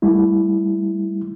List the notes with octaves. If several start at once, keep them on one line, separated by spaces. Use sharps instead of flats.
G3 A3 E4